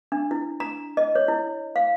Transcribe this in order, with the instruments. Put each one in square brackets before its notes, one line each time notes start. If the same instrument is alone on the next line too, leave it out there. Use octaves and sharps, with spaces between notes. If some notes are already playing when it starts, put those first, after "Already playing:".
[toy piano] D4
E4
A#5
D#5
C#5
E4
F5